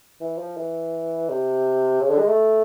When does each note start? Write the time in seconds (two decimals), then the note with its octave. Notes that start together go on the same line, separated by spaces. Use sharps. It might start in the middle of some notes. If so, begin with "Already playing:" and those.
0.21 E3
0.38 F3
0.57 E3
1.29 C3
2.01 C#3
2.10 D3
2.19 G#3
2.28 A3